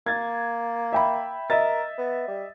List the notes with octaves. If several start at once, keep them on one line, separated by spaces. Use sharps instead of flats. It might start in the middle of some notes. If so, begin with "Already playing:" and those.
A#3 G#6 A6
E5 G5 B5
A#4 D#5 E5 A6
B3
G3